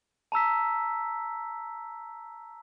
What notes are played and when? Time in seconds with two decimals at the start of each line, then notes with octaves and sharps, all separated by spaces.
0.32 A5 A#5 E6 B6